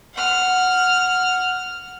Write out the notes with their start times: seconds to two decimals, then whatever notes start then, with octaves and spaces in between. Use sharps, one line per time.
0.14 F#5 F6